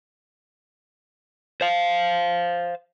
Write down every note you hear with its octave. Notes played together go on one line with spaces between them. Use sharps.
C5 F5